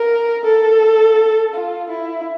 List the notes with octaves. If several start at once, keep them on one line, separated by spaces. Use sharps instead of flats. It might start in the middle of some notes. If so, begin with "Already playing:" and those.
Already playing: A#4
A4
F4
E4